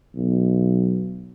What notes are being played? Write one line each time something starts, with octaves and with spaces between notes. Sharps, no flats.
B1